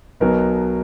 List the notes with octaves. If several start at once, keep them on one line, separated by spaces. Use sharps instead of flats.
B1 B2 F#3 A#4